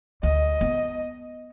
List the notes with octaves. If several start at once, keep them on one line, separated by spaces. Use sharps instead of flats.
D2 D#5
B3